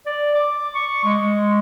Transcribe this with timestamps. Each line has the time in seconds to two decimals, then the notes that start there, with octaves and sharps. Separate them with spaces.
0.06 D5
0.35 D6
0.74 C#6
1.04 G#3